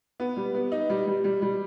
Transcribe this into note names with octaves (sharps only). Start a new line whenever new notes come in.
B3
G3
B3
D#4
G3
G3
G3
G3